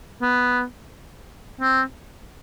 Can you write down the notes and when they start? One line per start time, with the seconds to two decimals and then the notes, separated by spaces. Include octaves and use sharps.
0.22 B3
1.61 C4